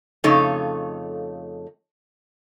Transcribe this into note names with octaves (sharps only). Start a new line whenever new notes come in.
F2 C#3 A3 D#4 A4 C#5